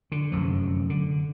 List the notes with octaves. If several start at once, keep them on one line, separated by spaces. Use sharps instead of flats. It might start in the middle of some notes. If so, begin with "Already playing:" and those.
D3
F1 F#2 F3
D3